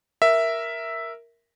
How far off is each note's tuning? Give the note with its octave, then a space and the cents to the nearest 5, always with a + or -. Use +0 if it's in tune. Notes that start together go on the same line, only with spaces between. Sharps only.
A#4 +0 E5 +0